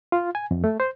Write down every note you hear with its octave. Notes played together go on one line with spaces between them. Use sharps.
F4
G#5
F2
A3
C5